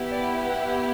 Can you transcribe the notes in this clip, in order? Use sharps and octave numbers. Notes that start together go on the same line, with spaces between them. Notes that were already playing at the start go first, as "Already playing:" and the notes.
Already playing: B3 E4 G4
D5
F#5